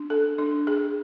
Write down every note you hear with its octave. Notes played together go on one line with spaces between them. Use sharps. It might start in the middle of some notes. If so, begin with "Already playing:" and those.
Already playing: D4
A4
D4
G#4